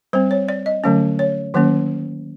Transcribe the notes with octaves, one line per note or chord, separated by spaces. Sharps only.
G3 C4 C5
C#5
D5
D#5
D3 F#3 A3 C#4
C#5
D#3 F#3 A#3 C#4